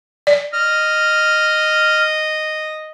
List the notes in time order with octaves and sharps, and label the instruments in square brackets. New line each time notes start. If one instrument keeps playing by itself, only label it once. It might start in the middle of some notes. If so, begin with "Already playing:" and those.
[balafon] D5
[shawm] D#5 [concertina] F6